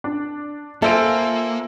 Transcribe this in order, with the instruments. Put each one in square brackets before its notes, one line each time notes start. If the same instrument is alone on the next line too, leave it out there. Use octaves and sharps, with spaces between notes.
[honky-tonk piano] D4
[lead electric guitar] A#3 [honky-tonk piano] F4 E6 D7 [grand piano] A4 C5 G#5 [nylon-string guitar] E5